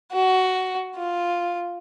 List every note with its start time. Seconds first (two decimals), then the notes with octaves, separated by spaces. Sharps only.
0.12 F#4
0.96 F4